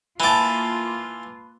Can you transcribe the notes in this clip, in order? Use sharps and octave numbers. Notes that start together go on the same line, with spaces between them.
E3 A#3 F4 B4 A5 D6